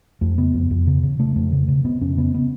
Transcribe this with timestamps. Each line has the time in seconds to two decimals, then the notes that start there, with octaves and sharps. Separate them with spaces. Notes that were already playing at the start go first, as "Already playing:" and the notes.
0.21 F2 A3
0.38 C#3 B3
0.54 F2
0.71 F2
0.87 C#3
1.03 C#3
1.19 C#3 A3
1.36 F2 A3
1.52 C#3
1.68 C#3
1.85 C#3 B3
2.01 F2 C#4
2.17 C#3 B3
2.34 B3